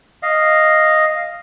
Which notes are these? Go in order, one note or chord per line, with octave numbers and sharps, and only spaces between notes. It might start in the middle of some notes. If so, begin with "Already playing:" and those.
D#5 F5